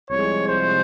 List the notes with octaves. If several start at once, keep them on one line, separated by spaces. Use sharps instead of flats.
C2 C3 F3 G#3 C#5
C5